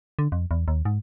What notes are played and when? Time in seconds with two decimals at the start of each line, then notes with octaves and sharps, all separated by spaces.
0.19 D3
0.32 F2
0.51 E2
0.68 D#2
0.85 G#2